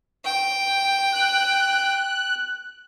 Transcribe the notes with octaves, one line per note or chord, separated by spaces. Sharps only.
G5
F#6